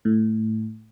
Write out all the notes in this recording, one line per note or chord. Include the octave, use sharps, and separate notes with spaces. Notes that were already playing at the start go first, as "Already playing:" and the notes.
A2